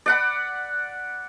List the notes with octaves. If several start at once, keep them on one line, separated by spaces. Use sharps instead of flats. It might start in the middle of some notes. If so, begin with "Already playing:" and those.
D5 F#5 B5